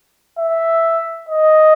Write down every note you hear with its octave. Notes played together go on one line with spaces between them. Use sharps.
E5
D#5